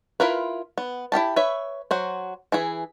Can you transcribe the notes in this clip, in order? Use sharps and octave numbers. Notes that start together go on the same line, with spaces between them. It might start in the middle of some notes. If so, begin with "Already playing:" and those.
E4 F4 A#4 B4
B3
E4 F4 G4 A5
B4 C#5 E5
F#3 F#4 C5
E3 E4 G#4